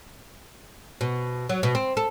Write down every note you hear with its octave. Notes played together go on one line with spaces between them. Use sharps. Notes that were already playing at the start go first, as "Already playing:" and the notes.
B2
F#3
B2
C4
A4